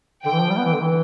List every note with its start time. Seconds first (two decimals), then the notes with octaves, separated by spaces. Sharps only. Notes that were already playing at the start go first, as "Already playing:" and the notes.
0.25 D3 G5
0.33 E3
0.41 F3
0.49 G3
0.57 B3
0.65 E3
0.73 D3
0.82 E3